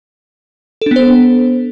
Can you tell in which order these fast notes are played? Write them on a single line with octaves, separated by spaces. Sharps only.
A4 D4 B3 C5